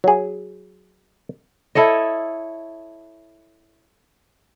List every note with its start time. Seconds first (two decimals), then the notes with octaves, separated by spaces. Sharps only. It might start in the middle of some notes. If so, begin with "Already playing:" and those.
0.04 F#3 G#4
1.75 E4 A4 C#5 D#5